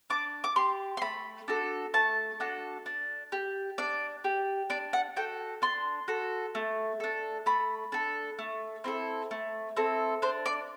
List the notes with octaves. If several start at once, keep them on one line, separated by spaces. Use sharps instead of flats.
D4 D6
D6
G4 C6
C6
A3 B5
D4 F#4 A4
A3 A5
D4 F#4 A4
D4
G4
D4 D5
G4
D4 D5
F#5
F#4 A4 G5
D4 C6
F#4 A4
A3
D4 A4
A3 B5
D4 A4
A3
C4 E4 A4
A3
C4 E4 A4
D4 C5
D5